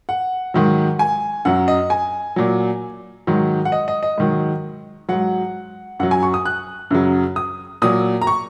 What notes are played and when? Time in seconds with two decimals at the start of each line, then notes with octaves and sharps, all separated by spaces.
0.09 F#5
0.54 G#2 D#3 F#3
0.99 G#5
1.45 F#2 F#3 F#5
1.68 D#5
1.90 G#5
2.36 A#2 F#3
3.27 G#2 D#3 F#3
3.65 F#5
3.72 D#5
3.88 D#5
4.03 D#5
4.18 G#2 D#3 F#3
5.09 G#2 F#3 F#5
5.99 F#2 F#3 F#5
6.11 G#5
6.23 C#6
6.34 D#6
6.45 F#6
6.91 F#2 C#3 F#3
7.36 D#6
7.82 A#2 F#3 D#6
8.22 A#5
8.27 C#6